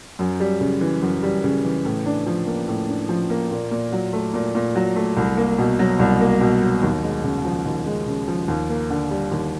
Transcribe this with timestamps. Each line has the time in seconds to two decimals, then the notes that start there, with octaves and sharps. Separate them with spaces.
0.19 F#2
0.40 G3
0.61 C#3
0.81 E3
1.02 F#2
1.23 G3
1.44 C#3
1.64 E3
1.85 A2
2.06 D4
2.26 F3
2.47 A#3
2.68 A2
2.89 D4
3.09 F3
3.30 A#3
3.51 A#2
3.71 A#2
3.92 F#3
4.13 A3
4.34 A#2
4.55 A#2
4.76 F#3
4.96 A3
5.17 C2
5.37 A#3
5.58 B2
5.79 F#3
5.99 C2
6.21 A#3
6.41 B2
6.62 F#3
6.83 D#2
7.03 G#3
7.24 C#3
7.45 F3
7.66 D#2
7.86 G#3
8.07 C#3
8.28 F3
8.48 D#2
8.69 A#3
8.90 D3
9.11 G3
9.32 D#2